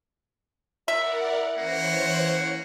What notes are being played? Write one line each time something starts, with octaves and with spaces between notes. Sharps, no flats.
E4 A#4 D5 E5 F#5
E3 A#3 C#4 C5 C#5 F#5